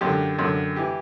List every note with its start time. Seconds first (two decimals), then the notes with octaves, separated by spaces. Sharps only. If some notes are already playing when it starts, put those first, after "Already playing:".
0.01 F#2 D3 G4
0.39 F#2 D3
0.76 E3 G4